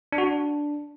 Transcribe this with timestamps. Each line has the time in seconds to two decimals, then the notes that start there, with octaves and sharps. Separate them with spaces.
0.12 D4
0.18 F#4
0.24 D4